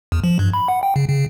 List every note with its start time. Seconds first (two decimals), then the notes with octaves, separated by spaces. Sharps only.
0.12 E2
0.24 F3
0.39 G2
0.54 B5
0.68 F#5
0.83 G5
0.96 C#3
1.09 C#3